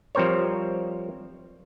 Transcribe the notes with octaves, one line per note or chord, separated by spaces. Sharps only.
F3 G3 C4 A#4 C5 C#5